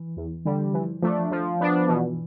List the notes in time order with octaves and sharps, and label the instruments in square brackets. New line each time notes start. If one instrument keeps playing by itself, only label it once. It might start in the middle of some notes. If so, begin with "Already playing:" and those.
Already playing: [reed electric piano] E3
[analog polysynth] E2
D3 G3
[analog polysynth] E3 [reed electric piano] F3
[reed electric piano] F3 [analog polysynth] A3 D4
[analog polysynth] F3
B3 D4
[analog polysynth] B2 [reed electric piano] E3